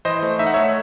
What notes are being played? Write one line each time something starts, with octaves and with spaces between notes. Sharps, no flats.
E3 C5 D#5
A3
D#4 E5
F#5
A3 C#5 E5